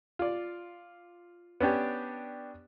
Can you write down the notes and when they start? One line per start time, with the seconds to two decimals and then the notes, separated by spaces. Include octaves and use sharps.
0.19 F4 D5
1.61 B3 C#4 D4 G4